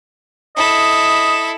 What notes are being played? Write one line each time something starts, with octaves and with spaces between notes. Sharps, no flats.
E4 A4 D#5